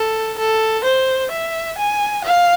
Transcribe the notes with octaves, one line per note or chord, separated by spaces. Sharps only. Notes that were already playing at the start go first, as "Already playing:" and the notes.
Already playing: A4
A4
C5
E5
G#5
F5